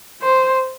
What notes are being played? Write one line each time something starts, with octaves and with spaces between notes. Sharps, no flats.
C5